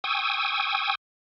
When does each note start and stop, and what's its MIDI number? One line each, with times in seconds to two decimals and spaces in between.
0.04 0.95 79
0.04 0.95 80
0.04 0.95 85
0.04 0.95 87
0.04 0.95 88